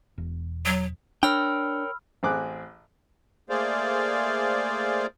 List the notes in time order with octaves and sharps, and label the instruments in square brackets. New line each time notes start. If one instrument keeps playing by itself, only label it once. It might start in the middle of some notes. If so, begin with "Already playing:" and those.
[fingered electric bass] E1
[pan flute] F#3
[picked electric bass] D4 [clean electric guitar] A#4 C#5 G5 [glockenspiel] B5 E6 F6
[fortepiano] A1 C4 G#4 D6 F#6
[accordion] A3 A#3 G#4 C5 D5 F5